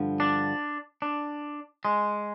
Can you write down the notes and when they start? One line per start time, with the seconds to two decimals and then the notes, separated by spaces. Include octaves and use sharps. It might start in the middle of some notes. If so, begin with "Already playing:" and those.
Already playing: G2 D3 F3
0.20 D4
1.02 D4
1.85 G#3